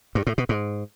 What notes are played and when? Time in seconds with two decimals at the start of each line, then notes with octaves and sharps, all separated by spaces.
0.15 G2
0.27 A2
0.38 B2
0.49 G#2